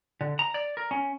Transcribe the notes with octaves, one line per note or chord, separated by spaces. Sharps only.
D3
A#5
D5
A#4
C#4